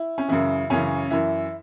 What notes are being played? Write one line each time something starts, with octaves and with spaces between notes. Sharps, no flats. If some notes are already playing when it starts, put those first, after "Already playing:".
Already playing: E4
C#4
F#2 C#3 E3 E4
F#2 C#3 E3 C#4
F#2 E3 E4